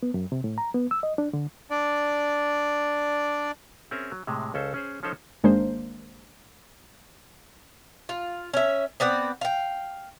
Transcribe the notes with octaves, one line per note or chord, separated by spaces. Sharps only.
B3
F#2
C3
A2
A#5
B3
E6
D#5
D4
D3
D4 D5
C4 C#4 G#4 A#4 E5
F#3
A2 C3 G#3
C#2 C#4 A4 C5
C#4 G#4 C5
F3 C#4 D#4 A4 C5 C#5
G#1 G#3 A#3 D4 C5
F4
C#4 E5
B3 C4 D5 F#5
F5 G5